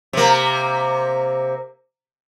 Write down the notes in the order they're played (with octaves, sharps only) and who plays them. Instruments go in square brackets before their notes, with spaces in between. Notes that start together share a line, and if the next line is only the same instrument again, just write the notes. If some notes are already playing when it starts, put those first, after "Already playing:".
[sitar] C3 A#3